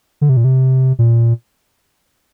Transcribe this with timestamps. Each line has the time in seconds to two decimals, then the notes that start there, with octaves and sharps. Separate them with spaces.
0.21 D3
0.29 C3
0.37 A#2
0.44 C3
0.99 A#2